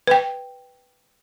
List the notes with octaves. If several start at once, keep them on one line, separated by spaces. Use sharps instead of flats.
B4 G5